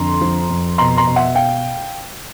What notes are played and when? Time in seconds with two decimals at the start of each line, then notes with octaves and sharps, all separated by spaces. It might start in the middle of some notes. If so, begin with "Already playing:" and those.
Already playing: F2 D3 A#5 C6
0.21 F3
0.50 F2
0.78 B2 A#5 C6
0.97 A#5 C6
1.07 B2
1.16 E5 F#5
1.35 F5 G5